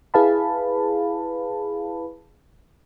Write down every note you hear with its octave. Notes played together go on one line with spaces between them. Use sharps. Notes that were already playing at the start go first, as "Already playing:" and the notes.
E4 G#4 B4 F5 A5 B5